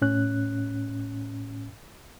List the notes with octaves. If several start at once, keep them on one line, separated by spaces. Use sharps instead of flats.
A2 C#4 F#6